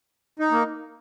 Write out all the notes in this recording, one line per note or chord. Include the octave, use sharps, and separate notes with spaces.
D#4
A#3